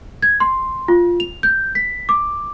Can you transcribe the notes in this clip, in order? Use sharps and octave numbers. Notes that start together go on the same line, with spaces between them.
G#6
C6
F4
F7
G6
B6
D6